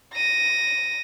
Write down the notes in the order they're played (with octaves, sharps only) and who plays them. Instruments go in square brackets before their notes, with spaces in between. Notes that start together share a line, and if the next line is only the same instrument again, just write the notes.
[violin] A#6 D#7